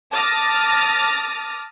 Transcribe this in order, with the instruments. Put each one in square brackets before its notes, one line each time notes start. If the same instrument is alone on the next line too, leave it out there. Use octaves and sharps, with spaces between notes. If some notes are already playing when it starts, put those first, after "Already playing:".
[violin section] A5 D6 D#6 F6 A6 A#6